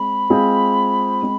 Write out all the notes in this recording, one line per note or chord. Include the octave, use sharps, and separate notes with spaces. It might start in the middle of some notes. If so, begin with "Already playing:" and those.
Already playing: G#3 C4 G#4 B5
G#3 C4 F4 G#4
G#3 C4